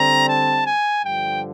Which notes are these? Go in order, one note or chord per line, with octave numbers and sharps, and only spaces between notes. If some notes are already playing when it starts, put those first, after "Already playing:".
Already playing: D3 G3 C4 A#5
A5
G#5
G2 D3 F3 G5